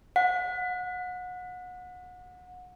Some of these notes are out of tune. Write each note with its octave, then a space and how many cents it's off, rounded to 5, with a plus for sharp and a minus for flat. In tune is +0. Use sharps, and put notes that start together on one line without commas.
F#5 -30